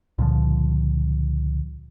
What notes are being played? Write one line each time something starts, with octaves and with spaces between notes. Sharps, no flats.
C#2 A#2 D3 F3